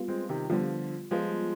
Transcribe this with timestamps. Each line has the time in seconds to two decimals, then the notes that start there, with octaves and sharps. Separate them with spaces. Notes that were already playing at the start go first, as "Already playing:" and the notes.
Already playing: G3 B3 F4
0.08 G#3 C4
0.29 C3 D#3
0.49 D3 F3 G3 B3 F4
1.11 F3 G3 G#3 B3 F4